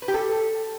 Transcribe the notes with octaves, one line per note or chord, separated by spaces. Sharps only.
B4
G4
A4